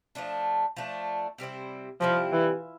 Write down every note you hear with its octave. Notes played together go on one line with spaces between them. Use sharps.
F3 A3 D4
F3 A3 D4
C3 G3 C4 E4
C3 F3 G3 C4 E4
E3